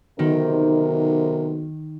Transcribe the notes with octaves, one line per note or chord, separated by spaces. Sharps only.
B1 C3 D#3 A#4